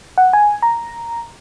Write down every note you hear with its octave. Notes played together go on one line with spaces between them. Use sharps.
F#5
G#5
A#5